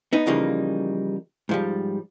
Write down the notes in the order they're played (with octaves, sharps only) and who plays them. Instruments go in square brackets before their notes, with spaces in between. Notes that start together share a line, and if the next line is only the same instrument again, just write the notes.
[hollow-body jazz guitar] B3 D#4
C#3 E3 F3 G3 A#3 D#4
G#2 F3 G3